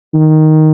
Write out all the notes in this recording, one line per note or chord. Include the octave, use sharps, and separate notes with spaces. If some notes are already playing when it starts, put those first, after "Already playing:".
D#3